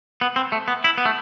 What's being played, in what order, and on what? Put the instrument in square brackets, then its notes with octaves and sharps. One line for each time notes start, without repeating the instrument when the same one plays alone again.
[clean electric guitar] B3
C4
A3
B3
E4
B3
A3